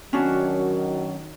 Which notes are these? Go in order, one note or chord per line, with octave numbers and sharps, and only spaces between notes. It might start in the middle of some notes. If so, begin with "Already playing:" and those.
D#3 F#3 C#4 D4 F#4